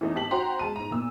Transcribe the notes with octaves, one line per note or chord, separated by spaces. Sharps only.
E3 A3 D#4
G#1 G4 A5 B6 F#7
F#4 C5 G5 A#5 C6
G#3 A5 D#7
G#2 A#5
E2 A#2 E6